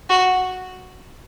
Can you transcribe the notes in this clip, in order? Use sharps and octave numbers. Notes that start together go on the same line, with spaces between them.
F#4